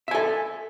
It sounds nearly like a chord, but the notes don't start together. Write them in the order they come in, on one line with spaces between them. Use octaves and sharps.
E5 G#5 A4